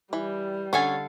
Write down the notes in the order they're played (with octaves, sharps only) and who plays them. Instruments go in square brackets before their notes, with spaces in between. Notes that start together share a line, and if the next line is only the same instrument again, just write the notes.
[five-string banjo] E3 [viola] G3
[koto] D3 A4 F5 [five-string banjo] C#4 G#5 [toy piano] F#5